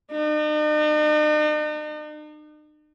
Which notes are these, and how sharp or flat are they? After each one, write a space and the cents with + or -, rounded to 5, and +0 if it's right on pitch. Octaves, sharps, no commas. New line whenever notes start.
D#4 -45